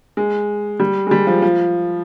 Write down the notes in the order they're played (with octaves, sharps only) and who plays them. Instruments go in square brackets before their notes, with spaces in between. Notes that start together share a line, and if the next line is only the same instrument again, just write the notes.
[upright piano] G#3
G3
G#3
G3
F3
F3